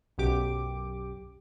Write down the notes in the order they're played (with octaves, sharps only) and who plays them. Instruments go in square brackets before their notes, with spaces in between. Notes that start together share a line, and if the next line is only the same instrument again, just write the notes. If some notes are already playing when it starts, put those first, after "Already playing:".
[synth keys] B1 F#2 G4 D6